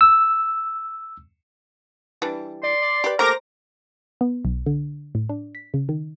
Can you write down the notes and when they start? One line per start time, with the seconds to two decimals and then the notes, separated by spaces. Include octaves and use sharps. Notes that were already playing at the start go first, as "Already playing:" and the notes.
0.01 E6
2.22 E3 G3 D4
2.63 D5 C6
2.82 D5
3.04 G4 B4
3.19 A3 A#3 G4 A#4 C5 A#5 D6 A#6
4.21 B3
4.45 B1
4.66 D3
5.15 A2
5.29 D4
5.55 B6
5.74 C#3
5.89 D#3